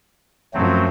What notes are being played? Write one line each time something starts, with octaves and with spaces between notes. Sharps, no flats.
F#2 F3 F#3 A3 C4